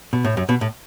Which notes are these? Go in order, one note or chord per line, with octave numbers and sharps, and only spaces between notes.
B2
A2
F#2
B2
A2